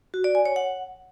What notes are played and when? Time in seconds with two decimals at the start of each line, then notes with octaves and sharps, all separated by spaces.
0.14 F#4
0.24 D5
0.35 G#5
0.45 C#5
0.56 F#5